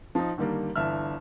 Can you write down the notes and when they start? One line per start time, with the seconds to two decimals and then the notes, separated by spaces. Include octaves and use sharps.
0.15 F3 D#4
0.38 D3 D#3 G3 A#3
0.76 G1 E3 D4 E5 F6